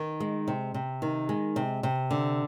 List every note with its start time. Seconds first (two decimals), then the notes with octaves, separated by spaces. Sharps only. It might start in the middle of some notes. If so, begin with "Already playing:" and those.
Already playing: D#3
0.20 G#3
0.48 C3
0.74 C3
1.02 D#3
1.29 G#3
1.56 C3
1.83 C3
2.11 D3